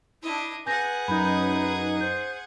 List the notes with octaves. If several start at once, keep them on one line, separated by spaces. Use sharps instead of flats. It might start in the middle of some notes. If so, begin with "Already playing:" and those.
D4 E4 D#5
G#4 B4 F#5 G#5 G6 A#6
F#2 D#4 B5 G6
C5 G6